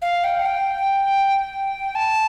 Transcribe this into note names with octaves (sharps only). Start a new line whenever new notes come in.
F5
G5
F5
G5
A5